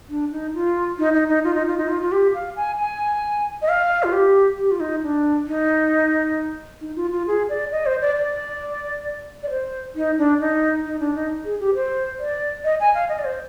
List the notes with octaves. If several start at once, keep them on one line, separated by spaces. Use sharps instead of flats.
D4
D#4
F4
D#4
D#4
D#4
F4
D#4
F4
D#4
F4
F4
G4
F5
G#5
G#5
D#5
F5
F4
G4
G4
F4
D#4
D4
D#4
D#4
F4
F4
G#4
D5
D#5
C5
D5
D5
D5
C5
D#4
D4
D#4
D#4
D4
D#4
G#4
G4
C5
D5
D#5
G#5
F5
D#5
D5
C5